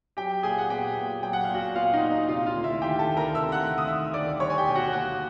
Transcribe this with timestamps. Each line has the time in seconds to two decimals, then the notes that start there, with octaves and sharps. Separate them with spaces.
0.17 F#3 G4 G5
0.43 A#2 G#4 G#5
0.58 F#5
0.70 B3 G4 G5
0.97 A#2
1.23 F#3 G5
1.33 F#5
1.44 A#2 F5
1.54 F#4 F#5
1.75 B3 F4 F5
1.93 D#4 D#5
2.02 A#2
2.11 D#4 D#5
2.28 C3 F4 F5
2.46 F4 F5
2.55 D2
2.64 E4 E5
2.81 D#3 G4 G5
2.99 A4 A5
3.08 D2
3.17 A#4 A#5
3.34 C3 E5 E6
3.52 F#5 F#6
3.61 D2
3.78 D#6
3.87 D#3 E5 E6
4.13 D2 D5 D6
4.40 G3 C#5 C#6
4.50 G#5
4.58 G4 G5
4.67 B2
4.75 F#4 F#5
4.93 A#3 F#4 F#5